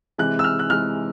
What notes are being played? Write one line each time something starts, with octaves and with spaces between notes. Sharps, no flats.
C3 E3 G#3 F#6
E6
F6
F#6
C3 E3 G#3 F6